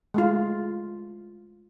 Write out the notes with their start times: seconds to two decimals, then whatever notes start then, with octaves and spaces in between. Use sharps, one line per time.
0.14 G#3 A3 F4